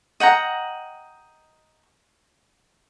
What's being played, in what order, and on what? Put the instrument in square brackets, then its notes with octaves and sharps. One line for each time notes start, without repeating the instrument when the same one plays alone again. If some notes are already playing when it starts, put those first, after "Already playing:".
[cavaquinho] D#5 F#5 G5 A#5